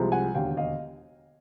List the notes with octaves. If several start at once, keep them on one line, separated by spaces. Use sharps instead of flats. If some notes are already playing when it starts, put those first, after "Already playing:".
Already playing: C2 C3 F3 G#3
F#5 G#5
E1 D#2 D3 F5 G5
D#5 F5